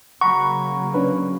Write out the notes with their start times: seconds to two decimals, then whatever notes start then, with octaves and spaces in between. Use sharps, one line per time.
0.21 C#3 F#3 A#3 F#5 A#5 B5 C#6
0.94 C#4 D4 B4